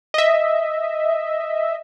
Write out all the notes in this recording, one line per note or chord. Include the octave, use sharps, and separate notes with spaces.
D#5 E5